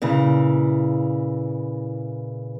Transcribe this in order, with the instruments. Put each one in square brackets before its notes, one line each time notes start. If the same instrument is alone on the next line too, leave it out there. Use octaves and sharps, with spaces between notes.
[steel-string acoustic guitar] A#2 C#3 E3